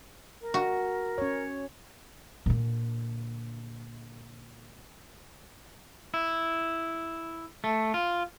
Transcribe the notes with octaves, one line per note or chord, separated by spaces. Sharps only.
A#4
F#4
C#4 C#5
A#2 D3
E4
A3
F4